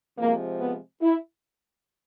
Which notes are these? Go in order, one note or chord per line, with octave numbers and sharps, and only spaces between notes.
C3 F3 G#3 A#3
B3
E4